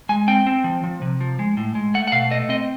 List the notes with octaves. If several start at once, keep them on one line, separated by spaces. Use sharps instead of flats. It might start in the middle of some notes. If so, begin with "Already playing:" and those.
G#3 G#5
C4 G5
C4
F3
F3
C3
F3
G#3
A2
G#3
A3 F#5
F#5
B2 F5
A3 D#5
C4 D#5